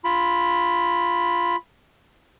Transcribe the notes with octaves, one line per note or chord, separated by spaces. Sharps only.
F4 B5